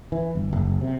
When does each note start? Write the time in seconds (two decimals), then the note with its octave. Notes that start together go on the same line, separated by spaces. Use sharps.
0.12 E3
0.35 G1
0.53 F#1
0.81 C3